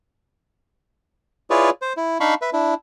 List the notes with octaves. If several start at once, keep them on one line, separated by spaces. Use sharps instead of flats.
E4 F4 G#4 B4 C#5 D5
C5
E4
D4 D#4 F5 B5 C#6
B4 E5
D4 E4